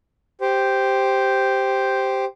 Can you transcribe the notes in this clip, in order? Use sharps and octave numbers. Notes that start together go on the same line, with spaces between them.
G4 C5